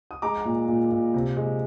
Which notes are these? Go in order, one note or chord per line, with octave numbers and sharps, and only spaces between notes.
D#6
G#3 A#5 D6
A#2
A#2
A#2
C3
G#3